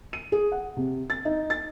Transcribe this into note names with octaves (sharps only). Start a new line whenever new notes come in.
D#7
G#4
F#5
C3
A6
D#4
A6